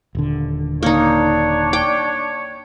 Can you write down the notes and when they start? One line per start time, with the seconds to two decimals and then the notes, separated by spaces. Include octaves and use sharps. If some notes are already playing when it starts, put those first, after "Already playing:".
0.15 D#1 D3
0.83 A#3 D4 D#4 C#5
1.73 G5